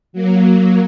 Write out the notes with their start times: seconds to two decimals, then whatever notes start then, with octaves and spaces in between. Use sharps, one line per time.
0.13 F#3 A#3